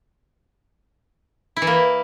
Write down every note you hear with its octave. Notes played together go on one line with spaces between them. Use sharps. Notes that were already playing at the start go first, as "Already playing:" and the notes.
E4
E3
A#3